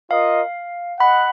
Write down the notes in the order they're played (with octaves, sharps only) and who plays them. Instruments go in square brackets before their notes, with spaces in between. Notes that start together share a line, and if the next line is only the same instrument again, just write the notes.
[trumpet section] F4 A#4 D#5 [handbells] F5
[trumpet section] D#5 F#5 [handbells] B5